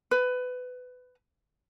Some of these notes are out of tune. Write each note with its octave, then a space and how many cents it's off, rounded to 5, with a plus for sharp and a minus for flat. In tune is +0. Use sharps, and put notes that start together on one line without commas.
B4 +20